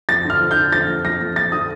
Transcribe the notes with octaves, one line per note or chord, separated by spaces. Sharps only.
F2 A6
D3 F6
F2
G6
D3
F2 A6
F2
F2 A#6
F2
F2 A6
D3 D#6